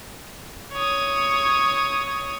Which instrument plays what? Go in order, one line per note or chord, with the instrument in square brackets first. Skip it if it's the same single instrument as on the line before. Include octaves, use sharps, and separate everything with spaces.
[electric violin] C#5 D#6